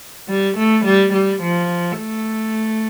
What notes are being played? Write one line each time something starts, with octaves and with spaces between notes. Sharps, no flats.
G3
A3
G3
G3
F3
A3